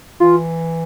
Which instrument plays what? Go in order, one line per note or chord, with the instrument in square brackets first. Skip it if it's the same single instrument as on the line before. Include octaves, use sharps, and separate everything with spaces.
[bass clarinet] E3 [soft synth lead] F4